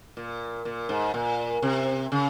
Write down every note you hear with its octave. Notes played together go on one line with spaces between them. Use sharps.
A#2
A#2
G#2
A#2
C3
C#3